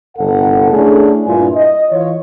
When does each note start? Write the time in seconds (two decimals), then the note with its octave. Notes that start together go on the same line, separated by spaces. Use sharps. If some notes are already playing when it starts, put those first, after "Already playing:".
0.17 G1 C2 A4 F#5
0.72 A3 C#4 D4 E4 G#4
1.25 G2 A#2 E4 F4 G#5
1.55 D#5
1.91 E3 F4 C#5